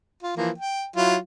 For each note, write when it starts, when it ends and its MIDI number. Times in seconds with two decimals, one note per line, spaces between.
0.23 0.36 65
0.37 0.50 52
0.37 0.50 53
0.37 0.50 58
0.58 0.86 79
0.96 1.16 54
0.96 1.16 64
0.96 1.16 65